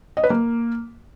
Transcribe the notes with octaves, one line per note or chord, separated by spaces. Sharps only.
D#5
B4
A#3